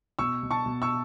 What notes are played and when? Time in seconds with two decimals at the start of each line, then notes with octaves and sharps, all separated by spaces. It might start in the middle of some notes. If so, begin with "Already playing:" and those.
0.19 B2 C#6 E6
0.43 B2
0.51 A5 C#6
0.66 B2
0.82 C#6 E6